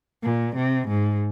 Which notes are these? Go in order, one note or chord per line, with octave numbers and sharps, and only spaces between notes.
A#2
C3
G#2